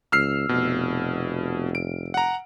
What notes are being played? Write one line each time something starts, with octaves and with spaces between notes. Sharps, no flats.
C#2 E6 F6 C7
F1 B2
D7
F#5 A#5